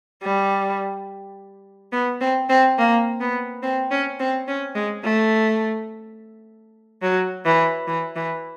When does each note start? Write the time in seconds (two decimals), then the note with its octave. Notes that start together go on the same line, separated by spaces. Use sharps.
0.23 G3
1.92 B3
2.21 C4
2.49 C4
2.78 A#3
3.21 B3
3.63 C4
3.91 C#4
4.20 C4
4.48 C#4
4.75 G#3
5.04 A3
7.02 F#3
7.46 E3
7.88 E3
8.16 E3